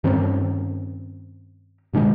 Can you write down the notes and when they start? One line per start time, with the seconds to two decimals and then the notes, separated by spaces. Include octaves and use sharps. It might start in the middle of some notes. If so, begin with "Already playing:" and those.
0.04 G2 D#3 C4 C#4
1.93 B2 D3 D#3 G#3